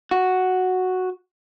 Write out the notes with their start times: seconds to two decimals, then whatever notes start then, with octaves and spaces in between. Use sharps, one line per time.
0.11 F#4